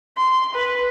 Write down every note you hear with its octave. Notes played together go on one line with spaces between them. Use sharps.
C6
B4